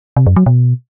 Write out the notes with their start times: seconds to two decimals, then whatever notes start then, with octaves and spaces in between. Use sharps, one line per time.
0.17 C3
0.26 F#2
0.36 F#3
0.46 B2